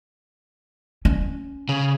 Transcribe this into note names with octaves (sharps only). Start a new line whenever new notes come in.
C#4
C#3